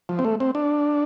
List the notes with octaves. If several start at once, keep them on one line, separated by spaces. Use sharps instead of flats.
F3
C4
A3
C4
D4